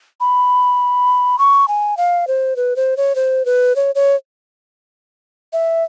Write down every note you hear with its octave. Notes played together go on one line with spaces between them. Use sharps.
B5
C#6
G#5
F5
C5
B4
C5
C#5
C5
B4
C#5
C#5
E5